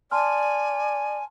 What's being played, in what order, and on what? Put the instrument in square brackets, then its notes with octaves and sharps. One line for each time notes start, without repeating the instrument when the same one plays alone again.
[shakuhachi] D5 [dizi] G#5 [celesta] A5 C6 F6